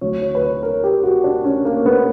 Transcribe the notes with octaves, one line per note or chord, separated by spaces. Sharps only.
D2 D3 F#3 C#5
C#5
B4
C#5
A#4
G4
F#4
D4
C#4
A#3
B3